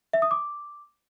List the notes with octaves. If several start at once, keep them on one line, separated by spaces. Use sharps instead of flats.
E5
D#6
D6